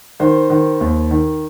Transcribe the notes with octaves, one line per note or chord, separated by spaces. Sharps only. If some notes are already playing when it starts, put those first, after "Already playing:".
D#3 C5
D#3
D#2
D#3